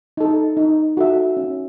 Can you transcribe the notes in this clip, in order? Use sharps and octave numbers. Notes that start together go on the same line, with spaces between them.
D#4 A4
D#4
F#4 A4 E5
C#4